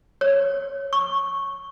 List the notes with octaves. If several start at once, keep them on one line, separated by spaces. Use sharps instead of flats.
C#5
C#6